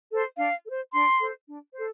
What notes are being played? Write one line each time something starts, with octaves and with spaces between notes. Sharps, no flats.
A4 C5
D4 F5
A4
C5
D4 C6
A4 C5
D4
A4 C5